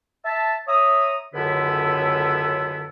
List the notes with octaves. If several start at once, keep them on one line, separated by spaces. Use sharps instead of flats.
E5 A5
C#5 E5 A#5 D#6
C#2 F#2 D3 B3 E4 A4